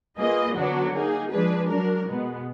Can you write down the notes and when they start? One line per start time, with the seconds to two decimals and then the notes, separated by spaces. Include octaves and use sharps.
0.18 A#3 F4 G#4 B4 D#5
0.56 D3 F#3 B3 D4 F#4
0.93 A#3 D#4 G#4
1.31 F3 G#3 D4 G#4 B4
1.69 F#3 D4 F#4 A#4
2.07 B2 G#3 B3